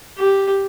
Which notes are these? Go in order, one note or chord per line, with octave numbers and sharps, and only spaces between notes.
G4